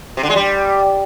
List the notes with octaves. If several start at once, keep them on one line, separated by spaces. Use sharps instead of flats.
C3
D3
G#3
G3